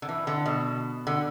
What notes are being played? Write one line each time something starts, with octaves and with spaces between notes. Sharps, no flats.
D3
E3
D3
B2
D3